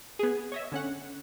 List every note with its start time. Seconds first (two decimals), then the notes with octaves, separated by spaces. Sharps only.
0.19 B3 G#4
0.52 C#5 D#5 E5
0.72 D3 C#4 F#5